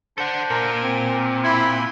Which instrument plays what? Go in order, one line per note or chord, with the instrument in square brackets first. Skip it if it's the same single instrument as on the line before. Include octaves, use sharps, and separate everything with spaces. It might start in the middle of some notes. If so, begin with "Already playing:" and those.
[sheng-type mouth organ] D4 C5 [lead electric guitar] A4 F#5
[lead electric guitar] A#2 [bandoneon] A#4
[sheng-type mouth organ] C4
[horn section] E4 [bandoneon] B5 C6